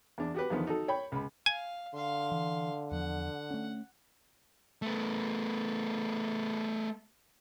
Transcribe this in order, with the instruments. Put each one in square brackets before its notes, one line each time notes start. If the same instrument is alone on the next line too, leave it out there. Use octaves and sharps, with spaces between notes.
[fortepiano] E2 D4
F#4 G4 B4
E2 D3 D#3 F3 B3
D#4 F#4 A4
C#5 G5 B5
C#2 B5
[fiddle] F5 [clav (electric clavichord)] G#5
[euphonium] D3 [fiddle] F5 C6
[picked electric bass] E3
[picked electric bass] E2 F3 [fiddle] F#5
[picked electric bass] A3 C#4
[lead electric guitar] A3 B3